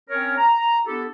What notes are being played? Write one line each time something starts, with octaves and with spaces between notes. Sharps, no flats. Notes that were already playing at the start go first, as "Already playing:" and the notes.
C4 C#4 A#4 C#5
A#5
B3 D4 E4 G4 A4